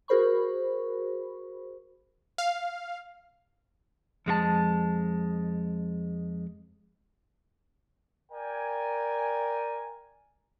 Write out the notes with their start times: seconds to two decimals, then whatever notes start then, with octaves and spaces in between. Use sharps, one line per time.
0.08 F#4 G#4 A#4 C5 B5 C#6
2.38 F5
4.26 F2 G#3 F4 A5
8.32 A#4 D5 G5 G#5